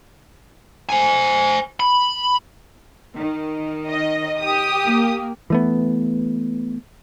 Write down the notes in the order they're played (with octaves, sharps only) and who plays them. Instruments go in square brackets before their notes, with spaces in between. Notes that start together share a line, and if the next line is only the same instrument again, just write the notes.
[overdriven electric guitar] C5 G#5
B5
[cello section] D#3
[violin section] D#5
G4 D#6
[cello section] A#3
[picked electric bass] E3 A3 B3